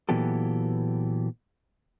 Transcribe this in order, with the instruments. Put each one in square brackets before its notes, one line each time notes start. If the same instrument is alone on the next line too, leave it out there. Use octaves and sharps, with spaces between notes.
[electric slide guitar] A#2 E3 F#3 B3 G4 A4